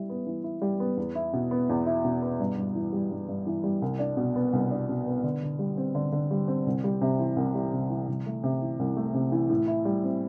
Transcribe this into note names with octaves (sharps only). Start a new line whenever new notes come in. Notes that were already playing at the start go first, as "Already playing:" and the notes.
Already playing: G3 E4
B3
E3
E4
G3
B3
E2
E4
B2
B3
E2
E4
B2
B3
G2
G2
E3
G3
G2
G2
E3
G3
C2
D4
B2
B3
C2
D4
B2
B3
D3
D3
G3
C4
D3
D3
G3
C4
C2
G3
C3
E3
C2
G3
C3
E3
C2
A3
C3
E3
C2
A3
C3
E3
A2
E4
G3
C4